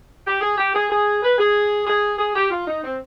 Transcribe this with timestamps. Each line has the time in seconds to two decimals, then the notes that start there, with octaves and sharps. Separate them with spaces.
0.25 G4
0.41 G#4
0.57 G4
0.74 G#4
0.89 G#4
1.22 B4
1.38 G#4
1.87 G#4
2.18 G#4
2.35 G4
2.50 F4
2.66 D#4
2.84 C4